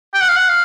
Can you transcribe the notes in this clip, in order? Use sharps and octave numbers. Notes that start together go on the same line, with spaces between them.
G5
F#5
F5
F#5
F5